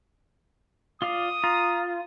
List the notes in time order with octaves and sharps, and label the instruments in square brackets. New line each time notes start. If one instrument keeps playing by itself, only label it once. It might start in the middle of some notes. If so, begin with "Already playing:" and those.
[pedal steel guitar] F4 D5 F5 [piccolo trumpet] D#6
[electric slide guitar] F4 [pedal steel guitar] A#5